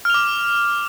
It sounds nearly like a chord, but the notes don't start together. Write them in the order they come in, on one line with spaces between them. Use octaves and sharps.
F6 F7 D6